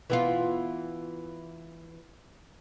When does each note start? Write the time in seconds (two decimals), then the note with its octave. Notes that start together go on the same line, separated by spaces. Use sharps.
0.10 E3 B3 F4